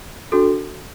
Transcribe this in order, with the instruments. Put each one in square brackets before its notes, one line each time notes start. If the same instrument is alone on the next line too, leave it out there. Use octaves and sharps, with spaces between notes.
[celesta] D4 F#4 A4